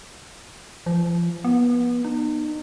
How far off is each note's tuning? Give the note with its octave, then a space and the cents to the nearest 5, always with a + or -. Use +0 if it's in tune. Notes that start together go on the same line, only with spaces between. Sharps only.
F3 -30
B3 -25
D#4 -35